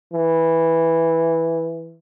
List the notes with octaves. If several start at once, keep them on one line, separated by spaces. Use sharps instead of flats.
E3